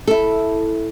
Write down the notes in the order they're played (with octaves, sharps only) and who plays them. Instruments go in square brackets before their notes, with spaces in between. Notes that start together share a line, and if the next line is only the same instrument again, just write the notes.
[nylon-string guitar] E4 A4